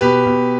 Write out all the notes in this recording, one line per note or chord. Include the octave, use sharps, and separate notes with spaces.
B2 G4 B4
B2